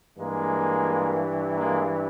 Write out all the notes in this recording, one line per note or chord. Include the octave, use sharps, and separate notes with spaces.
G2 E3 G#3 A#3
G#3 A#3